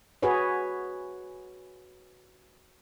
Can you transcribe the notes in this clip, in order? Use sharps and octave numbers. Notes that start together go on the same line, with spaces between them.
F#4 G#4 B4 C#5